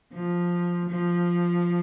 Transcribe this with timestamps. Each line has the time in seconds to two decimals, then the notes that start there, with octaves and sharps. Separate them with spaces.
0.13 F3
0.89 F3